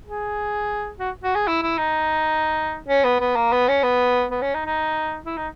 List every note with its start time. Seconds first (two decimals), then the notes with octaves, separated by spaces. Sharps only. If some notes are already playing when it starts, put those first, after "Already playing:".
0.05 G#4
0.99 F#4
1.23 F#4
1.35 G#4
1.47 E4
1.63 E4
1.78 D#4
2.88 C#4
3.04 B3
3.20 B3
3.36 A#3
3.52 B3
3.68 C#4
3.83 B3
4.31 B3
4.42 C#4
4.55 D#4
4.66 D#4
5.26 E4
5.37 D#4